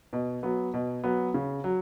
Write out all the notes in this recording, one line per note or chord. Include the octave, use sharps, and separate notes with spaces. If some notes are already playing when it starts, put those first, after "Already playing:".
B2
F#3 B3
B2
F#3 B3
C#3
F#3